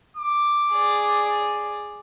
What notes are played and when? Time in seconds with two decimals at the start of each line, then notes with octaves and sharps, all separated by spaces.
0.17 D6
0.72 G#4 D5